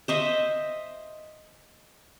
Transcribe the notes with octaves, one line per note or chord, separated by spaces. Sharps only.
C5 D#5 E5